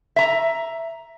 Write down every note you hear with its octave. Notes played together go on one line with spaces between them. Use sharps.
E5 A#5